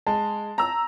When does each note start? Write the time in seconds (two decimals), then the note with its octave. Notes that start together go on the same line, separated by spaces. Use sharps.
0.07 G#3 A5
0.58 A#5 E6